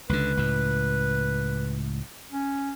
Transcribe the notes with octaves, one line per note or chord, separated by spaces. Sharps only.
C#2 D3 B4
C#2 A2
C#4